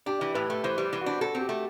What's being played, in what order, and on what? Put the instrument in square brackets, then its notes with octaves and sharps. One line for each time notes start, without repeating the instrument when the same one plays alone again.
[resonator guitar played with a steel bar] D4 [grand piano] G4
[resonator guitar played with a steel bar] E3
[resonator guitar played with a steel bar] A2 [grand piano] B4
[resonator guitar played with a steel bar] A3
[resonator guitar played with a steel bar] E3 [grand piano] C5
[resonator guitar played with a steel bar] G3
E3
[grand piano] F#4
[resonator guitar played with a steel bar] D4
[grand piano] F#4 [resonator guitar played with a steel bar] A4
[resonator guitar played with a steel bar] C4
[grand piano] G4
[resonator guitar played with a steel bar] A3